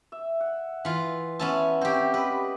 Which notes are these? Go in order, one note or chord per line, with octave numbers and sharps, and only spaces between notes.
E5
F#5
E3 F4
B3 C#4 E5 A5
C4 F#4 G4 E5
G3 B4 D#5 B5